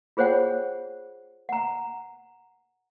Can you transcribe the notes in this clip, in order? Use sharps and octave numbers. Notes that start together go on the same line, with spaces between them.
F4 G#4 C5 C#5 F#5 G5
F#5 A#5